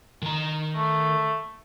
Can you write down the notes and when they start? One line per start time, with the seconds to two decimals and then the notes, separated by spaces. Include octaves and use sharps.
0.22 D#3 A#5
0.76 A3